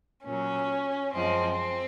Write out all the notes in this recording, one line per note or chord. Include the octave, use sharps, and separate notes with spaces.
A#2 F#3 C#4
F#2 F3 G#3 C4
C4